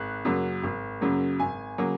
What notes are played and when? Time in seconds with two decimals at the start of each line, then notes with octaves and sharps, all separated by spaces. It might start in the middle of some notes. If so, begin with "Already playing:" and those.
Already playing: G#1 F#6
0.25 F#2 C#3 F#3 A#3
0.63 G#1
1.01 F#2 C#3 F#3 A#3
1.40 G#1 G#5
1.78 C#3 F#3 A#3